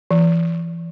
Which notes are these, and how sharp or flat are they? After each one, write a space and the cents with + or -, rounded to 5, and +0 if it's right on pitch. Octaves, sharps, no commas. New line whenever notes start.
E3 +30